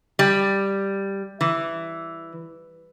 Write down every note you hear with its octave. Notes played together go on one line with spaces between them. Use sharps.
G3
E3